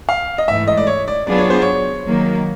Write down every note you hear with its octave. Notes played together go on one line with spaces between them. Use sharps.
F5
D#5
G#2 E3 A3 E5
D#5
D5
C#5
D5
F#3 B3 D4 F4 G#4 D5
C#5
C5
C#5
D#3 F#3 A#3